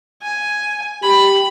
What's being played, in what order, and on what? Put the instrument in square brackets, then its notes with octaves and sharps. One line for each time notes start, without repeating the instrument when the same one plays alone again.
[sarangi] G#5
[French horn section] G4 [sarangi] B5